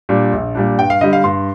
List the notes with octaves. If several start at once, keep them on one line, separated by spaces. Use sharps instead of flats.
A#2 G3 D4
A#1
A#2 G3 D4
G2 G5
F5
D3 G3 D#5
F5
G2 C6